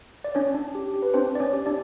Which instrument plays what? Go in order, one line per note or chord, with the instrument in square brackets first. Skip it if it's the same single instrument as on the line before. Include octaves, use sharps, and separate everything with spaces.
[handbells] D5
C#4 D4 C#5
D4
G4
G4
B4
C4 D4 C5
D4 D5
C#4 C#5
G4
D4 D5